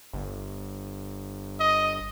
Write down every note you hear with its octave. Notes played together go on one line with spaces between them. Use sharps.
G1
D#5